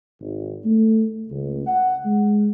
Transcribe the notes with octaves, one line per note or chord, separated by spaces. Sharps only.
G#1
A3
C#2
F#5
G#3